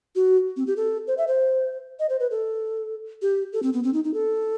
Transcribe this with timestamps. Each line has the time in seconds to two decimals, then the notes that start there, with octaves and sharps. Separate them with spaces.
0.16 F#4
0.57 C4
0.67 G4
0.77 A4
1.07 C5
1.18 E5
1.28 C5
2.00 D#5
2.10 C5
2.20 B4
2.31 A4
3.22 G4
3.53 A4
3.63 C4
3.73 B3
3.84 C4
3.94 D#4
4.04 D#4
4.14 A4